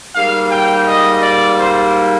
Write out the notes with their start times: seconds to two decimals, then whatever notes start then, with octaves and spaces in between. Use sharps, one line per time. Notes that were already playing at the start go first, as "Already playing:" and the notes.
0.15 G#2 G3 A#3 F5
0.51 G5
0.87 D#5
1.23 D5
1.58 C5